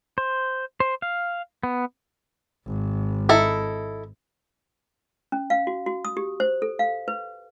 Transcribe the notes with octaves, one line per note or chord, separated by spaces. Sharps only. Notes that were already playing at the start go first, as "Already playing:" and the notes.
C5
C5
F5
B3
G#1
D#4 E4 A4
C#4
F5
F#4
F#4
D#6
G4
C5
A4
F5
B4